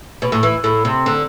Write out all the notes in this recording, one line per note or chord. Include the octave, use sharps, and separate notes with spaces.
B2
A2
E3
A2
C3
D3